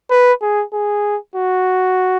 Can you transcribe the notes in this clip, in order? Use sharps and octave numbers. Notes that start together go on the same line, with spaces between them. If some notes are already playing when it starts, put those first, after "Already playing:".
B4
G#4
G#4
F#4